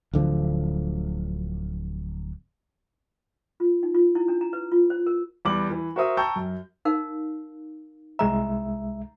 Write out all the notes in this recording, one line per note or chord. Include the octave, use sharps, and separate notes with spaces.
D1 D3 F3
F4
D#4
F4
E4
D4
A#5
B4
F4
C5
A#4
E2 G3 D6 F#7
E3
F#4 A#4 C5 E5 D#6
G5 A5 A#5 C#6 E6 G6
F#2
D#4 A#4 F5
C2 G#3 E5 A#5